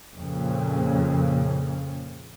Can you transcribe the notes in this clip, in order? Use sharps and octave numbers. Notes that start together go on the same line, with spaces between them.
F2 A#2 C#3